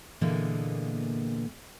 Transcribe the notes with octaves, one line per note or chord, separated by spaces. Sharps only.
A#2 D3 E3 G#3 A#3 B3